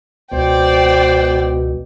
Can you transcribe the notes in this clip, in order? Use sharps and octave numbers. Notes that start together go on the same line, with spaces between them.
C#2 B2 C5 D5 G5